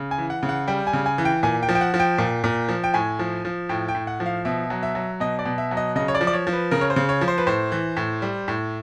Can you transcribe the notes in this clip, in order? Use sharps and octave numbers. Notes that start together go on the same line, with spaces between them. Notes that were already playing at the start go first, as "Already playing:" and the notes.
Already playing: C#3
G#5
E3
F#5
C#3
F#5
G3 G5
G#5
C#3
G#5
E3
G5
A#2 G#5
G5
F3
G5
F#5
F3
G5
A#2
A#2
F3
G5
A2 G#5
F3
F3
A2 G5
G5
A2
F#5
F3
F5
B2 E5
F#3
E5
F#3
B2 D#5
D5
B2
E5
F#3
D#5
C#3 D#5
C#5
D5
F3
D5
C#5
F3
B4
C#3 A#4
C#5
C5
C#3
C#5
F3
C5
B4
A2 C5
E3
A2
G3
A2